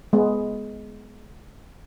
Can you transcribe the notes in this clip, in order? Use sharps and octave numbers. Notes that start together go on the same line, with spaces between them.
G#3 B3